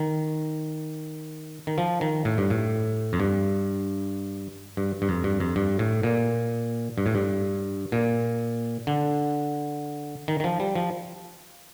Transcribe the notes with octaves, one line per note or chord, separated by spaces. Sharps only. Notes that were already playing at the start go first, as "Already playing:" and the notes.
Already playing: D#3
D#3
F3
D#3
A2
G2
A2
F2
G2
G2
G2
F2
G2
F2
G2
A2
A#2
G2
A2
G2
A#2
D3
D#3
D#3
F3
G3
F3